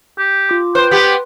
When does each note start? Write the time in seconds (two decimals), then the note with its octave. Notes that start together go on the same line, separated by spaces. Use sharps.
0.18 G4
0.49 F4 D6
0.75 B4 C5 G5 C6
0.91 B3 G4